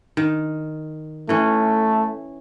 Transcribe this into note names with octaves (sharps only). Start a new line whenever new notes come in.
D#3
E3 A3 C#4